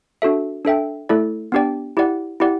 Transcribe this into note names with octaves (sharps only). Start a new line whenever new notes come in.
D4 F#4 A4 E5
D4 A4 E5 G5
A3 E4 A4 D5
B3 D4 G4 D5 G5
E4 G4 D5 F#5
E4 G4 D5 F#5